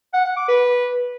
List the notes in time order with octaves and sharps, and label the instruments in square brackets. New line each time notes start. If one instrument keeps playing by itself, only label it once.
[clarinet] F#5
F#5
D6
B4